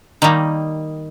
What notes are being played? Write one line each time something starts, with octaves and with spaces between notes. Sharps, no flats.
D#3 G3 A#3 D#4